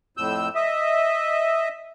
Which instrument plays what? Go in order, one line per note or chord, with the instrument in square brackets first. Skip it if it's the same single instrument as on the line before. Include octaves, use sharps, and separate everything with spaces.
[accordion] F2 A2 E6 G6
D#5 E5